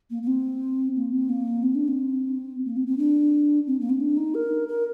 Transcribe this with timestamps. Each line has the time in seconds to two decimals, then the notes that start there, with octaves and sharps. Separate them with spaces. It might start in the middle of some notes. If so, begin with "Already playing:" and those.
0.10 A#3
0.23 A#3
0.27 C4
0.96 A#3
1.12 C4
1.29 A#3
1.63 C4
1.75 D4
1.88 C4
2.65 A#3
2.76 C4
2.87 C4
2.98 D4
3.67 C4
3.80 A#3
3.89 C4
4.00 D4
4.17 D#4
4.35 A#4
4.68 A#4